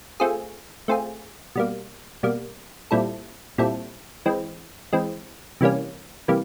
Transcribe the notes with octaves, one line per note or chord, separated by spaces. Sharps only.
A3 C4 F4 G#4
A3 C4 F4 G#4
B2 G3 A#3
B2 G3 A#3
A#2 G3 C4 E4 A4
A#2 G3 C4 E4 A4
E3 G#3 C4
E3 G#3 C4
C3 E3 G3 A#3 C#4
C3 E3 G3 A#3